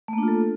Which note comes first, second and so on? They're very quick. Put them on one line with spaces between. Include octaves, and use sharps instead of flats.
A3 A#3 D4 F4 A4